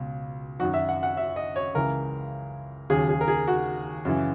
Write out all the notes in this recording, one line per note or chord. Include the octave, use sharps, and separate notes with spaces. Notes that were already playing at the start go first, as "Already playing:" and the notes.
Already playing: C#2 B2
F#2 D#3 F#3 F#4
E5
F#5
F#5
E5
D#5
C#5
C#2 C#3 E3 A#4
D#2 C#3 F#3 G#4
G#4
A#4
G#4
F#4
F#2 C#3 E3